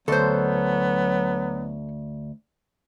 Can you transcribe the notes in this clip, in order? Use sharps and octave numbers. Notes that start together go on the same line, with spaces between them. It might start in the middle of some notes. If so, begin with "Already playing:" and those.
D2 F#3 B3 A4 C5